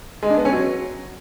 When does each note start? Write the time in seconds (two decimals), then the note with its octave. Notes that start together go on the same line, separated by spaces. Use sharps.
0.23 G#3
0.30 D4
0.38 B3
0.45 C#4
0.53 F#3